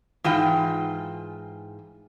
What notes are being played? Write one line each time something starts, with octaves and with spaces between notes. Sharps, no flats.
G#2 E3 F4 G5